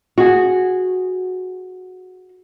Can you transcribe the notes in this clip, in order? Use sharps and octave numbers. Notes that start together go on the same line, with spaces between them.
F#4 G#4